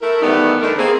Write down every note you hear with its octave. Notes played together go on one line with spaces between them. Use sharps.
A3 E4 A#4
D#3 E3 G3 A3 B3 D#4
E2 D3 G3 A3 D#4 A#4
A#3 C4 G#4